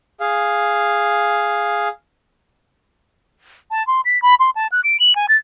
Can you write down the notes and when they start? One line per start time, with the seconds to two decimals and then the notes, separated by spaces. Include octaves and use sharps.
0.20 G#4 F5
3.71 A5
3.87 C6
4.05 B6
4.22 B5
4.40 C6
4.56 A5
4.72 F#6
4.84 D7
5.00 F#7
5.16 G#5
5.29 A6